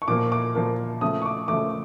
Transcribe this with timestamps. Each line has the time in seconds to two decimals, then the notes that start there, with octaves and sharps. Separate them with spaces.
0.02 C#6
0.08 A#2 F3 A#3 D6
0.32 D6
0.55 A#2 F3 A#3
1.01 C#3 F3 A3 D#6
1.22 C#6
1.26 D6
1.48 C#3 F3 A3 D6